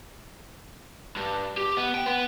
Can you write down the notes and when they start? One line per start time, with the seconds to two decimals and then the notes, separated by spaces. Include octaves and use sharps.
1.16 G2
1.57 G4
1.77 B3
1.95 G5
2.06 B3